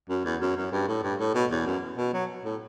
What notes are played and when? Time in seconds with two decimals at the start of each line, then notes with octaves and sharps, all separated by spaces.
0.09 F#2
0.25 E2
0.41 F#2
0.57 F#2
0.72 G2
0.88 A2
1.03 G2
1.19 A2
1.35 B2
1.51 E2
1.66 F#2
1.98 B2
2.13 F#3
2.44 A2